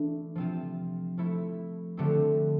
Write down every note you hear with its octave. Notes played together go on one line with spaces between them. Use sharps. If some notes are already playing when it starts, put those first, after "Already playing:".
Already playing: E3 A3 D4
C3 F3 C4 F4
F3 A3 E4
D3 F3 A3 C4 G4